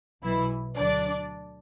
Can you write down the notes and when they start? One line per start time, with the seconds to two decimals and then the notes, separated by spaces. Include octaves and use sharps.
0.22 B1 B2 E3 F#3 E4
0.77 D2 D3 F#3 D4 D5